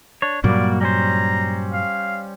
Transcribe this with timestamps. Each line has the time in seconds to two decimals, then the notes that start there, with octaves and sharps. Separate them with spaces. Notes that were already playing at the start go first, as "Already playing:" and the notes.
0.22 D4 C#5
0.44 G2 A#2 F#3 G3 A#3 F#4 D5
0.81 G3 C#4 C5 A#5
1.73 F5